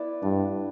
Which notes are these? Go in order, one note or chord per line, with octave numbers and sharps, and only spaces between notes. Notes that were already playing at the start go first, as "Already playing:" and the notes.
Already playing: B3 E4 B4 D5
G2 D4